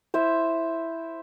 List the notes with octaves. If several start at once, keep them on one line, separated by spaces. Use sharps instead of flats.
E4 C5 E5